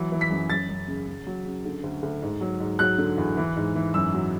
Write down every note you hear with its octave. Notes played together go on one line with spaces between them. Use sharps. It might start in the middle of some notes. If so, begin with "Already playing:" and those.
Already playing: E3 F#3
E3
B6
F#2
F#2 A6
F#2
C#3
C#3
F#3
C#3
D3
D2
D2
G#2
F#3
G#2
F#3 F#6
D3
E2
E3
G#2
E3
F#2 E6
F#3